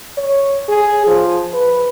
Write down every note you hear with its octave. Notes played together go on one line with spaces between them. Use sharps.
C#5
G#4
F3
B4